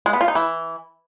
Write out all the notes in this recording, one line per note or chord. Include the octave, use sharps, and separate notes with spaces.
G#3
B3
F4
D#4
E3